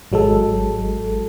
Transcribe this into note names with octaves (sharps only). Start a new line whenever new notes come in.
G#1 F#3 G#3 A4